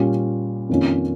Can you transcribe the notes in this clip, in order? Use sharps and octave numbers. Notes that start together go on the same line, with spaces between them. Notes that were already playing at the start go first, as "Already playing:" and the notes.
Already playing: A#2 G3 C#4 F4
F2 D#3 A#3 C#4 F4